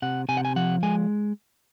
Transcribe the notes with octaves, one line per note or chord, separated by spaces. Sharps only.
C3 F#5
C3 G#5
F#5
G#5
F3 F#5
G#3 G#5